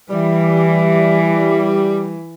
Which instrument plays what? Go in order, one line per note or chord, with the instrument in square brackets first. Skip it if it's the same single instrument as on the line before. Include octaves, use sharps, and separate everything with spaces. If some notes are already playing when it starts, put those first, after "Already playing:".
[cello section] E3 [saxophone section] G3